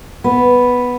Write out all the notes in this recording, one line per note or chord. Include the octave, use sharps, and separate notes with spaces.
B3